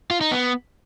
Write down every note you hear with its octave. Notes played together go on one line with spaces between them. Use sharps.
F4
D#4
B3